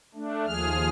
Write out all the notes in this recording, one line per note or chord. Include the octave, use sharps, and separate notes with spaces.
A3 D4
D#2 F3 G#4 F6